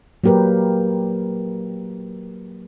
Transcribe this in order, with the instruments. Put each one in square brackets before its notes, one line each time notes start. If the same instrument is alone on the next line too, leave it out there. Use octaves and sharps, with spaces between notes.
[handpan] F#3 A#3 G4 A#4 B4